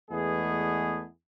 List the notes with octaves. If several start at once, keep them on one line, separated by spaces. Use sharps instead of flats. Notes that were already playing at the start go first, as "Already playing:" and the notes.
E2 G#3 A3 B3 G#4